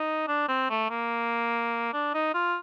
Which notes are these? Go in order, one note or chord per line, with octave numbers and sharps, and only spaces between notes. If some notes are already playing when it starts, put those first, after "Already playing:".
Already playing: D#4
D4
C4
A3
A#3
D4
D#4
F4